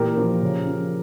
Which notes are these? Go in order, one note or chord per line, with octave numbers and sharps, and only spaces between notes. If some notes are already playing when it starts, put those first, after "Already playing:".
Already playing: A#2 E3 G4 A#4
F3
C#3
F3